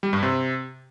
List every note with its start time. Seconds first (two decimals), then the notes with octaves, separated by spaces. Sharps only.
0.03 G3
0.13 G2
0.23 C3